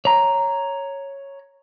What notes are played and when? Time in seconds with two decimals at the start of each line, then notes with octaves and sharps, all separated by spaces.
0.05 C#5 A#5